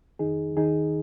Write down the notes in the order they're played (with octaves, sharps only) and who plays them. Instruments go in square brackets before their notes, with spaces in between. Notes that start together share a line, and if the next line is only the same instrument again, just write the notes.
[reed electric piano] F2 D#3 D#4 G#4
D#2 D#3 D#4 G#4